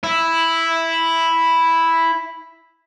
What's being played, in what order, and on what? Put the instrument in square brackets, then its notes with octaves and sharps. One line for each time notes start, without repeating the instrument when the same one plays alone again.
[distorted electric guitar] E4 E5